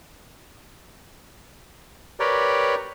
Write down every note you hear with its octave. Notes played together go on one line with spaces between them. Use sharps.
G4 A#4 B4 C#5 D5 G5